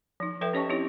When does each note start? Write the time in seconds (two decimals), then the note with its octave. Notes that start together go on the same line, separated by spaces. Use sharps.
0.20 F3 D#4
0.41 F3 A4 B4 E5 G5
0.53 C#4 G4 C#5 D#5 A5 C#6
0.69 C4 D#4 E4 G4 C#5